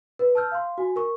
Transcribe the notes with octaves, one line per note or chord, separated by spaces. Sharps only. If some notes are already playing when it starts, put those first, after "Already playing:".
B4
A5 E6 F6 G6
F5 C6
F#4 G#5
A#4 C#6